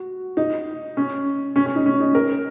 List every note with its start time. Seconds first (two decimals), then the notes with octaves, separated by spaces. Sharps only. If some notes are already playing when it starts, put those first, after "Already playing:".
Already playing: F#4
0.37 D#4
0.97 C#4
1.56 C#4
1.66 C#4
1.75 D#4
1.86 C#4
2.00 D#4
2.15 A#4